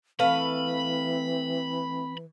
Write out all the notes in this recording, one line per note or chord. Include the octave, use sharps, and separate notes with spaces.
E3 A3 C4 B4 F5 B5